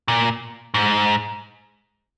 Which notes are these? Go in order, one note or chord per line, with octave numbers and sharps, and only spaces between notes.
A#2
G#2